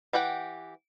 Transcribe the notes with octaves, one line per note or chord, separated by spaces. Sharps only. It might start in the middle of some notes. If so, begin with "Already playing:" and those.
E3 G4 F#5 G5